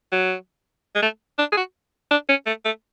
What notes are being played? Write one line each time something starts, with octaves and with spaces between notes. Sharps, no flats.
F#3
G#3
A3
D4
G#4
F#4
D4
C#4
A3
A3